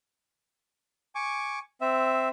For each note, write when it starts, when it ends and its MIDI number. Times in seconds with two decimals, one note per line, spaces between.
1.15 1.59 80
1.15 1.59 85
1.15 1.59 86
1.81 2.29 60
1.81 2.29 76